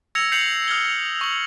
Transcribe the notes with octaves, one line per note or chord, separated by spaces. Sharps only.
E6 G#6 A#6 C#7 F7
G6 C7 C#7 F7 F#7
D#6 F6 G#6 G7
C#6 F#7